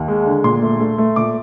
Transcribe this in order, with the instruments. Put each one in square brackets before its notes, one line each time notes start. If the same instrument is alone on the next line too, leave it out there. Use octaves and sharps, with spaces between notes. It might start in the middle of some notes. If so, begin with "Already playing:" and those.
Already playing: [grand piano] D#2
G#3
D3
A#2 C6
A3
A3
A3
A#2 D6